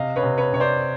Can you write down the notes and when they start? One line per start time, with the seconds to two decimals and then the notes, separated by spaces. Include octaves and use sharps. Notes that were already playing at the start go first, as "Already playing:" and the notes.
Already playing: C3 D#5 F5
0.16 B4 C#5
0.23 C3
0.38 B4 C#5
0.53 C3 C#5
0.60 C5 D5